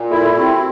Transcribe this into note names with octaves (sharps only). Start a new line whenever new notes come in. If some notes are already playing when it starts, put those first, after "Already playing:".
Already playing: A#2
E4 A4
A#4
A4
C4 G4
F#4